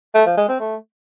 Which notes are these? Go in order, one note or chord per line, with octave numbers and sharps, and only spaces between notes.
A3
F3
G#3
C4
A3